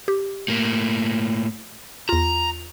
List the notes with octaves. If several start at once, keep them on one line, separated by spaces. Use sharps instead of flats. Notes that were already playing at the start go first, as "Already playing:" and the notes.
G4
A2 A#3
E2 F4 A#5